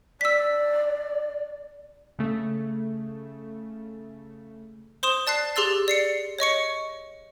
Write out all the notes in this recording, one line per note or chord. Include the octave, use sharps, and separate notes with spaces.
D5 E6 B6
C#3 A3
C5 C6 D#6 E7
D5 A5 F#6 C7
G4 G#4 C6 E6 A6
D5 C7 C#7
C#5 D#5 C#6 C#7